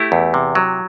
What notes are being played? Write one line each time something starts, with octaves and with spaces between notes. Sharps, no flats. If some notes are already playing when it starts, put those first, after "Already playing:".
Already playing: A3 E4 G4
E2
C3
F#3